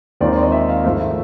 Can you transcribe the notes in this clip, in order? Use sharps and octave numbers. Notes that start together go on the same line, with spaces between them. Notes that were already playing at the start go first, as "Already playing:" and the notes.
D#2 D#3 G#3 C4 F4 D5
D5
D#5
E5
F5
G#1 G#2 F3 A3 F5
E5